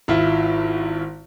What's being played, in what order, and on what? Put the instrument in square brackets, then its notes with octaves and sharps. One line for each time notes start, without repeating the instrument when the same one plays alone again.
[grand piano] G#1 E4 F4